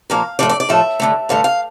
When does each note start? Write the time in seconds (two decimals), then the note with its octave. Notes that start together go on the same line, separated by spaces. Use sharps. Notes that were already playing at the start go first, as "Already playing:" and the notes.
0.10 A#2 F3 A#3 F5
0.39 A2 F3 A3 D5
0.49 D5
0.60 D5
0.69 A2 F3 A3 E5
1.00 G2 D3 A3
1.29 G2 D3 A3 F5
1.44 F5